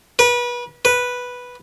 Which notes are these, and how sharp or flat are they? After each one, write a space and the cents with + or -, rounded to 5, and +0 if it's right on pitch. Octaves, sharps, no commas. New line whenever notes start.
B4 -30
B4 -5